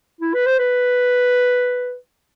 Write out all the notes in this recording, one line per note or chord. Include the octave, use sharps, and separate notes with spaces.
E4
B4
C5
B4